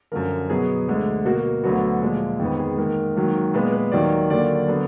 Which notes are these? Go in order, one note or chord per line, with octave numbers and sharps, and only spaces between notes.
F#2 D3 F3 A#4
B2 F#3 B3 G#4
D2 D3 G#3
B2 A#3 F#4
D2 D3 F#3 B3 F#4
A#2 F3 G#3
F2 D#3 G#3 B3 G#4
G#4
G#2 D#3 A#3 A#4
G#2 D#3 F#3 A#3
A#2 G#3 B3 B4
B4
D#2 D#3 F#3 A#3 D5
D#2 D3 F#3 A#3 D5
D3 F#3 B3